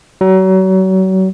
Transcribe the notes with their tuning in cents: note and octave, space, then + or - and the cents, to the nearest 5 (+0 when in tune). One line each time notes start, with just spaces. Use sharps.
F#3 +35